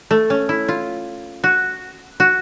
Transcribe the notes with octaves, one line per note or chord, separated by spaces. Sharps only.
A3
C#4
E4
F4
F#4
F#4